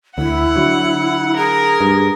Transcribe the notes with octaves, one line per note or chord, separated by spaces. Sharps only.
D2 E4 F#5
D3 F#3
G#4 A#4
G2